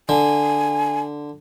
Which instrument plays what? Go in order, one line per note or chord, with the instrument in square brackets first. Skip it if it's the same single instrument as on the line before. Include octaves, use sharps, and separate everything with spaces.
[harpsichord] D3 [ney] G#5